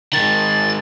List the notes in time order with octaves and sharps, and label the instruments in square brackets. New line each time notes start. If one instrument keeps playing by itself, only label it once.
[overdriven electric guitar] D#3 G#3 [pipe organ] A6